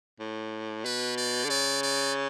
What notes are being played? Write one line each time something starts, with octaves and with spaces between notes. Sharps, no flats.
A2
B2 B4
D5
D3
C#3 D5
D5